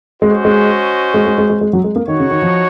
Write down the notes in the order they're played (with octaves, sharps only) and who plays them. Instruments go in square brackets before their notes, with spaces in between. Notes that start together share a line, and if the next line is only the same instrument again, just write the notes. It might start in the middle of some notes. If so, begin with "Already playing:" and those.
[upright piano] G#3 [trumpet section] C#4 F#4 C5 D#5
[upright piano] G#3
G#3
G#3
G#3
G#3
G#3
F#3
G#3
A#3
[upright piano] D#3 [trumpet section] D#4 F#4 C#5
[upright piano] C#3
D#3
F3